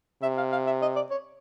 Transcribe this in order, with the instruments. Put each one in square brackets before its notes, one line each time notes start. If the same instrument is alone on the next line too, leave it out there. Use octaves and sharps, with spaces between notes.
[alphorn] C3 [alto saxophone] E5
[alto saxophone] F5
F5
E5
D#5
D5
C#5